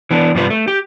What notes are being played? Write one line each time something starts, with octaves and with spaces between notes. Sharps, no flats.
E3 B3 D4
G2 C3 G3 F4 G#4 B4
A3
G4